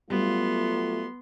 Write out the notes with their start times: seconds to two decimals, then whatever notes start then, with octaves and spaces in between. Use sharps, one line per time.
0.10 F#3 G3 A3 B3 F4 C6